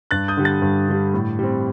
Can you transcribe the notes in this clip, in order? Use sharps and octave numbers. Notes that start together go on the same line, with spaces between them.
G2 F#6 A6
D#6 G6
D3 G3
F#6 A6
G2
D3 G3
A2
G3 C4